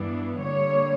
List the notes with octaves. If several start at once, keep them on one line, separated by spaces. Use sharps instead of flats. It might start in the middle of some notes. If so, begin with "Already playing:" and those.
Already playing: G2 E3 B3 D4
D3 G3 A#3 C#5